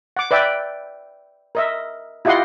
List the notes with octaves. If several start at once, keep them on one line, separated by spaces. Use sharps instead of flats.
F#5 D6
B4 D5 E5 G5
A#4 D#5 E5
E4 F4 G4 D#5 F#5 C6